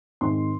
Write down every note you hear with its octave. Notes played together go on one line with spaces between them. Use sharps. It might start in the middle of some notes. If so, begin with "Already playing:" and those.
G#2 D#3 G#3 C4 C6